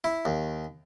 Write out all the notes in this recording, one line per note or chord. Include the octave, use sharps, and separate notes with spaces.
E4
D#2